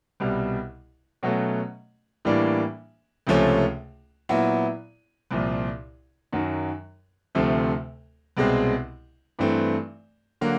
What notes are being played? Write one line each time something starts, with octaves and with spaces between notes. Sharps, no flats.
C2 B2 G3
B2 F#3 A3 C#4
A2 E3 G3 A#3 D4
C#2 C3 F3 A3 C#4
A#2 F#3 B3 E4
C2 A#2 F3
F#2 D#3 F#3
D2 C3 F3 A3 C4
C2 B2 G#3 C4
G2 E3 A3 C4
D3 F#3 A#3